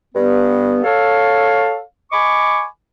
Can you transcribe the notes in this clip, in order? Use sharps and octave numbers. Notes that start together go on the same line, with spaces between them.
G2 B3
A4 C#5 F5
D#5 G#5 B5 C#6 D6